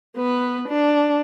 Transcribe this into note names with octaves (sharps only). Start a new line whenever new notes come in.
B3 B4
D4